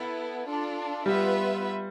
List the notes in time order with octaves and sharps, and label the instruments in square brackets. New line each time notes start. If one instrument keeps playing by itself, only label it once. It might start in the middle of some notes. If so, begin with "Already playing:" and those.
Already playing: [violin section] B3 E4 A4
D4 F4 A4
[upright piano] G3 [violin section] B3 F4 B4 E5